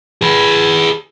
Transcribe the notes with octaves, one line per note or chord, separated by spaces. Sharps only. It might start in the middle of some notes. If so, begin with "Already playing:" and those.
G#4 B4